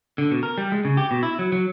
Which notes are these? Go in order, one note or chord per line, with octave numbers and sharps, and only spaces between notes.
D3
B2
A#4
G3
G#3
C#3
G4
B2
E4
F#3
F#3